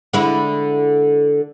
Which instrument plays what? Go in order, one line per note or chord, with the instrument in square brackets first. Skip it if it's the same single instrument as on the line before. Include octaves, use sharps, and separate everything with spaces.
[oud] D3 G#3 E4